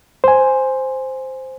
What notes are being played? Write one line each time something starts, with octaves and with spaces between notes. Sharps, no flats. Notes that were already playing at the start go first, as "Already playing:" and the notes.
C5 G#5